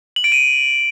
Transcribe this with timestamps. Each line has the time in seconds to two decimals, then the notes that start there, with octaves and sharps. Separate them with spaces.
0.16 F#7
0.24 D7
0.32 D#7